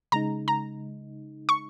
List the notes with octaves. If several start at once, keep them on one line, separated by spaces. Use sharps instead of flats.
C#3 G#3 D#4 A#5
A#5
C#6